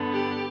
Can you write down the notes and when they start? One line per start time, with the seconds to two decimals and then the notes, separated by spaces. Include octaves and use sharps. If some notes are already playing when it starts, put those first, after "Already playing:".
Already playing: G2 D3 B3
0.12 G4